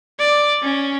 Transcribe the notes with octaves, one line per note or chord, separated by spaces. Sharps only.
D5
C#4